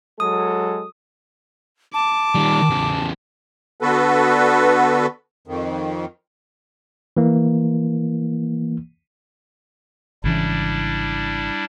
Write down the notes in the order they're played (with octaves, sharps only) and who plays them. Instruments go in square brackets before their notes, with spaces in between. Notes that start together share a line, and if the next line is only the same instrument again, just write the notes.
[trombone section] F#3 G#3 A4 [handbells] D#6
[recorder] A5 [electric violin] D6
[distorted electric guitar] D#3 G3
E2 C#3
[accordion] D3 B3 F#4 A4 B4
F2 D#3
[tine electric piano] E3 A#3
[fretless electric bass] G#1 C#3 E3 [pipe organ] G3 D4 E4